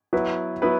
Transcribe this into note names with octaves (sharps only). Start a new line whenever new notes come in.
F#3 B3 E4 B4
F#3 B3 E4 B4